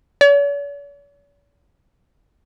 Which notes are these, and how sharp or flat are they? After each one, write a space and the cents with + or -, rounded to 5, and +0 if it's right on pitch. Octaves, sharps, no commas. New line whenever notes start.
C#5 +45